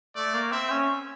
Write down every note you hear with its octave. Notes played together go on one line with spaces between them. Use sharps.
A3 D5
A#3
C4 E5
C#4